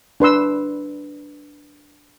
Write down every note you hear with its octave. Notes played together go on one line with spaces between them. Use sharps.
D4 B4 C6 E6